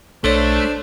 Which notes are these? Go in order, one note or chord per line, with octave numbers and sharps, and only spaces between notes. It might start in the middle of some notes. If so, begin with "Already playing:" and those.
B1 A3 D4 A4 C5 C#5